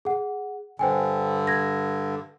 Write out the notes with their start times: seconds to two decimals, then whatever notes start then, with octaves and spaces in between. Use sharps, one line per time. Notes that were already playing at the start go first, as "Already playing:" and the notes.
0.05 G#4 F#5
0.79 G2 D3 C5 G5 G#5
1.47 G#6 A#6